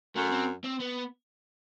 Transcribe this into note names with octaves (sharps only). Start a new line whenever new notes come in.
F#2 A3
C4
C4
B3